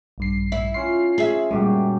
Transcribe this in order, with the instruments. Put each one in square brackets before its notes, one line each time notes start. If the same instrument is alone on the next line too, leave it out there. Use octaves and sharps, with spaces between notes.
[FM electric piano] A#1 G2 C7
[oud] E4
[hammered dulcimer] C#4 F4 [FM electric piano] C7
[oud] G#4 E5
[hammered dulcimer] F#2 F#4 G4 [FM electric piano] A#2 G3 G#3